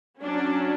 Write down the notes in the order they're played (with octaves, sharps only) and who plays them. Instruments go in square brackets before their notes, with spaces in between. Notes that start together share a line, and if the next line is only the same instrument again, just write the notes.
[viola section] F#3 C#4 D4